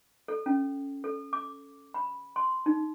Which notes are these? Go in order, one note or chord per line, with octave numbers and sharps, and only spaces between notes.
A4
C#4
A4
D6
B5
C6
D#4